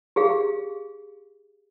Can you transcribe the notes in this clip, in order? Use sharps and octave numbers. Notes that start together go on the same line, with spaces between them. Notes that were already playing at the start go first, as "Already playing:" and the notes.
G4 G#4 F5